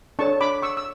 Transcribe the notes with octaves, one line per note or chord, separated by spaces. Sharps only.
D4 A4 C#5 A5 C#6
B5 D6
C#6 E6
E6